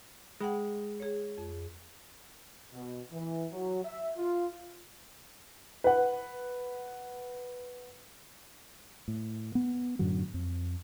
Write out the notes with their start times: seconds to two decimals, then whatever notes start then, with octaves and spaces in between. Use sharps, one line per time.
0.41 G#3 F#5 G5 B5
1.00 G#4 C#5
1.38 F2
2.73 B2
3.11 E3
3.52 F#3
3.83 E5
4.17 F4
5.84 B4 F#5
9.08 A2
9.55 B3
9.99 F#2 A2 D3 F#3
10.34 F2